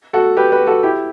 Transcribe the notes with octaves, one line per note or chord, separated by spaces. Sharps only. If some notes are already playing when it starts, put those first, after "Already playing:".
F#4 A4
G4 B4
G4 B4
F#4 A4
E4 G4